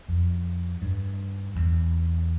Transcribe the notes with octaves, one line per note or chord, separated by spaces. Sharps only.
F2
G2
E2